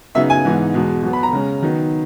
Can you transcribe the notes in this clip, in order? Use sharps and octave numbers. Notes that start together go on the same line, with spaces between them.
C#3 F#3 B3 D#4 E5
G#5
G#2 E3 B3 D#4
E2 B2 G#3
B2 F#3 B3
B5
A#5
C#3 G#3 C#4
D#3 F#3 B3 D#4